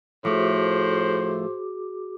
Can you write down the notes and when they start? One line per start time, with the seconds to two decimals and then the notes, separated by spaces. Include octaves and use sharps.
0.25 A2 F3 A3 F#4 G#4 C5 D6